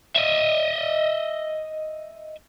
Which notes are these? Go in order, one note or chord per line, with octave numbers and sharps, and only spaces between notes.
D#5 E5